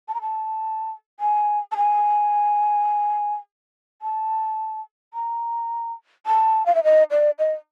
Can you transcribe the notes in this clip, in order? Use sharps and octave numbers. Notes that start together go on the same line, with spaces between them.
A5
A#5
A5
G#5
A5
G#5
A5
A#5
A5
F5
E5
D#5
D5
D#5